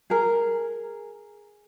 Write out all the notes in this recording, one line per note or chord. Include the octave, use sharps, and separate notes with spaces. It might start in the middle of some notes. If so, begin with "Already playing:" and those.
G#4 A#4